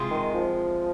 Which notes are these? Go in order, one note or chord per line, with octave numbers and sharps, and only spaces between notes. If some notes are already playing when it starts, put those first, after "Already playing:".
Already playing: C3 G#3 F4 G#4
D#3
F3